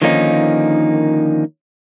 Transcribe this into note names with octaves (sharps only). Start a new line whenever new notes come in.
D3 D#3 F3 A#3 C#4 D#4